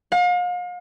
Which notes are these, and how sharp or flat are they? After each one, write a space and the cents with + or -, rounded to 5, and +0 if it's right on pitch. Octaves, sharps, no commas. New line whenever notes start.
F5 +40